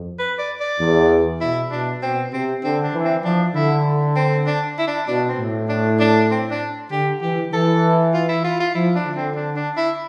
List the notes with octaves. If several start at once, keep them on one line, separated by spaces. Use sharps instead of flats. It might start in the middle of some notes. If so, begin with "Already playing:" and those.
Already playing: F2
B4
D5
D5
E2
B2 E4
B2 D4
B2 C4
C3 C4
D3 C4
D4
E3
C4
F3 D4
D3 E4
C4
D4
E4
D4
B2 D4
C4
A2
D4
D4
C4
D4
D3 G4
E3 G4
E3 A4
F4
E4
F4
F4
F3 E4
D4
D3
C4
D4
D4
E4